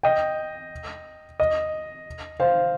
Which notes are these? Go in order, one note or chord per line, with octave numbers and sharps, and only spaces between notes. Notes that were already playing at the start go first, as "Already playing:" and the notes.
D#5 G5
D#5
C5 F5